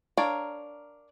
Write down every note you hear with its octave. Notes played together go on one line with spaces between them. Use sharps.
D4 A#4 C#5 F5